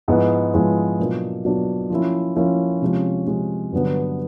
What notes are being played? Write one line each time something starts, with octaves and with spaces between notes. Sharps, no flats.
G#2 F3 G#3 B3 E4
G#2 F3 G#3 B3 E4
B2 F#3 A#3 D4 F4
B2 F#3 A#3 D4 F4
F3 A#3 C#4 E4
F3 A#3 C#4 E4
C3 F3 G#3 C#4
C3 F3 G#3 C#4
G2 D3 F#3 B3 D4